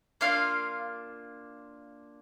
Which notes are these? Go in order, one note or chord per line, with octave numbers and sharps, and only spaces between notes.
A#3 D4 F4 F5